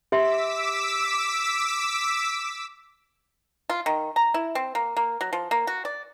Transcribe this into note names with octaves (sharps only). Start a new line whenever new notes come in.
G4 E5 C6 D6 E6 B6
F4
D#3
A#5
E4
C4
A#3
A#3
F#3
F3
A#3
F#4
D5